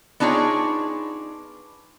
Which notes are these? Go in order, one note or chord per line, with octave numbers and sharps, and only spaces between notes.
B3 D4 D#4 F4 G#4 C#5